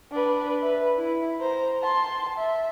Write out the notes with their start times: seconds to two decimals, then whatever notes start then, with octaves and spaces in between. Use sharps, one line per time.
0.12 D4 B4
0.62 B4 E5
0.98 E4
1.41 C5 A#5
1.82 A5 C6
2.38 E5